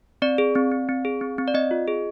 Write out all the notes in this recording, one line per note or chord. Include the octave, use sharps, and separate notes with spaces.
C4 D5
G#4
C4
C4
C4
G#4
C4
C4
D5
C4 D#5
F4
G#4